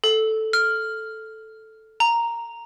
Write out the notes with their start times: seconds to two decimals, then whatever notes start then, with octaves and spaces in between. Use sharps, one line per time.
0.04 A4
0.53 F6
2.00 A#5